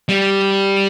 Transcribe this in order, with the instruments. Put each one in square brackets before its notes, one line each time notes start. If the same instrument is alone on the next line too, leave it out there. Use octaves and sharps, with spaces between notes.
[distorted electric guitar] G3